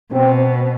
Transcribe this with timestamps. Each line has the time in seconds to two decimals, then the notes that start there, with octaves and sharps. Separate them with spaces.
0.12 B2 C4